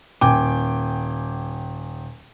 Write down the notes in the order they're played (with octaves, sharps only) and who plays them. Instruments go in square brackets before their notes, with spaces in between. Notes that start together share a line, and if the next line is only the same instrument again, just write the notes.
[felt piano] D#1 G5 G#5 D6